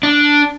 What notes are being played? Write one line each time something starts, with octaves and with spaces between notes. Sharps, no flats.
D4